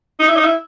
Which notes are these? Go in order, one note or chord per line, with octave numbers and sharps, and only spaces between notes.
D#4
E4
D#4
E4